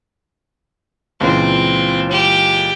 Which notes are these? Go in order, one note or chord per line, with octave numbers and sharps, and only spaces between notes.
C#2 A#2 E3 C4
G4